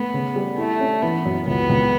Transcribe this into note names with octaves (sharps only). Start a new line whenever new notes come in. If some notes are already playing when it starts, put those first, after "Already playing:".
Already playing: A3 B3
C#3
G3
A3 E4
C#4
E3 B3
F#2
C#2 B3
C#2